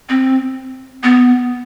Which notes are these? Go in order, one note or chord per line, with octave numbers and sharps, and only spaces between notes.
C4
B3